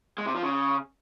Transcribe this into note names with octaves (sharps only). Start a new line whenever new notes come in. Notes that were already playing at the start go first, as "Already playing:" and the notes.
G#3
C3
F3
C#3